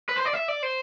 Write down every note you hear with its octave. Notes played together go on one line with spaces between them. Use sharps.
B4
C5
D5
E5
D5
C5